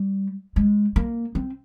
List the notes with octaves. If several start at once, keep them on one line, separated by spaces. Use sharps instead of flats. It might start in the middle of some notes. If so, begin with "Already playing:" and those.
Already playing: G3
G#3
A#3
C4